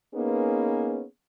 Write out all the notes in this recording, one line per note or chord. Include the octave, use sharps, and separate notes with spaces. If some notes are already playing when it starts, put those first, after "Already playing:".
A#3 B3 C#4 D#4 G#4 B4